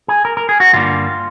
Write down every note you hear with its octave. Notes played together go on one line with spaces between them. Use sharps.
G#4
A#4
A#4
G#4
F#4
G2 D3 G3 A#3 D4 F4